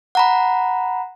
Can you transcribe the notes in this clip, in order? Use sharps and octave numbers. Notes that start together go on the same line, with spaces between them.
F#5 A#5 B5